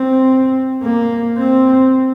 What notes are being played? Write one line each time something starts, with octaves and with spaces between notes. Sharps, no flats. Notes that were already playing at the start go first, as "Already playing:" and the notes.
Already playing: C4
A#3
C4